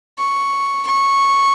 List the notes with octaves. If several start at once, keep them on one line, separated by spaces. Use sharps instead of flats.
C#6
C#6